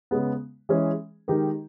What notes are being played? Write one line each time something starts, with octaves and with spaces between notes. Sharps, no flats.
C#3 G#3 B3
E3 G#3 C#4 G#4
D#3 G#3 D#4 G4 A#4